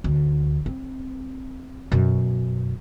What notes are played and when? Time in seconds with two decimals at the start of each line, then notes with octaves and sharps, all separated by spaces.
0.04 D2
0.66 C4
1.92 F#2 B2